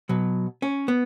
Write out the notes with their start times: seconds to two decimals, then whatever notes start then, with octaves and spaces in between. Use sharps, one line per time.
0.09 B2 F#3
0.62 C#4
0.88 B3